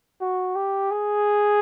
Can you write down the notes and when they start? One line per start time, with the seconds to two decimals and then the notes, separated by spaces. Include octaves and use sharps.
0.21 F#4
0.56 G4
0.91 G#4